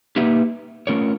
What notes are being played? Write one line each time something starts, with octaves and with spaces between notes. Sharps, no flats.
A#3 D#4 G4 B4 E5
A3 C#4 F4 A#4 C#5